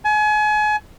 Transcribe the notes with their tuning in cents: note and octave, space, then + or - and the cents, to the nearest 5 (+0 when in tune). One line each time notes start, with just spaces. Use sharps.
G#5 +35